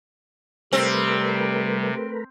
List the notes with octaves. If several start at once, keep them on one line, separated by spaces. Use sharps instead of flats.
C3 G3 A3 C4 A#4 B4